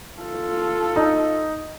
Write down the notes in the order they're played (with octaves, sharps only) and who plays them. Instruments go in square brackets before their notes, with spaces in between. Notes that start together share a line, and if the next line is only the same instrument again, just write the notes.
[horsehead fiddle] F4 A4
[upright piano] D#4